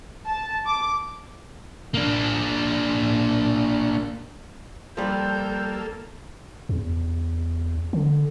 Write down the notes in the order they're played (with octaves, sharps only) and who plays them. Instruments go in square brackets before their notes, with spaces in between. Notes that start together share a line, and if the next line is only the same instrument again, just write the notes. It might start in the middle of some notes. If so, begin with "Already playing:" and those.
[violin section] A5
D6
[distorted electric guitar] A#3 D4
[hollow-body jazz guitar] F3 G3 [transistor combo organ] A#3 A4 [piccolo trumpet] G6
[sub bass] E2
D3